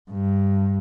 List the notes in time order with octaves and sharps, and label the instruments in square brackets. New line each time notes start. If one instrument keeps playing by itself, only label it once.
[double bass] G2